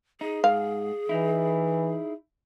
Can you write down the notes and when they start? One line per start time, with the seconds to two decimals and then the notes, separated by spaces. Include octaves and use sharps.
0.21 D#4 G#4
0.44 G#2 F5
1.09 E3 D#4 E4